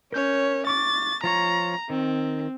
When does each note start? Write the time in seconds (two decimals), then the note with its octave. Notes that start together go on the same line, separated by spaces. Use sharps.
0.13 C#4 A#4 C#5 G6
0.67 C#6 D6 A6
1.24 F3 F4 C#5 A#5
1.90 D#3 C4